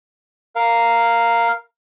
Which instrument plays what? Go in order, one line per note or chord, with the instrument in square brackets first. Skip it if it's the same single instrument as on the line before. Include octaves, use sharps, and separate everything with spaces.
[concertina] A#4 F5